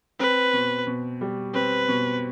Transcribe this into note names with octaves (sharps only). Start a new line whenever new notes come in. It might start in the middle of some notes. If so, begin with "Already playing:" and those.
C4 B4
B2
B2
G3
C4 B4
B2